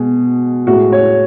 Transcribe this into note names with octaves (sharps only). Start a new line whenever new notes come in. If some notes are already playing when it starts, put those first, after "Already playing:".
Already playing: B2 G#3 G#4
A2 G#3 F#4
C#5